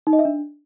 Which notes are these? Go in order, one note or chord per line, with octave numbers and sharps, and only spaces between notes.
D#4
D#5
E5
D4